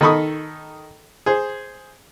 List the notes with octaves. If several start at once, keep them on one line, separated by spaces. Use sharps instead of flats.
D#3 D#4 A4 B5 C#6 D#6
G#4 C5